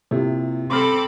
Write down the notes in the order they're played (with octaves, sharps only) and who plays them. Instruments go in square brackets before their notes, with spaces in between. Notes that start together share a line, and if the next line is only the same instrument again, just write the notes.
[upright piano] C3 [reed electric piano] A#3 E4 F4
[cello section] C4 A4 [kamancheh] B5 D6 [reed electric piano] C6 F6